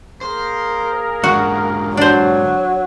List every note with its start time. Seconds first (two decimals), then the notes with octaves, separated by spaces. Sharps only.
0.21 A#3 G#4 A#4 C5
1.24 G#2 D3 F#4
1.97 F#3 D4 C5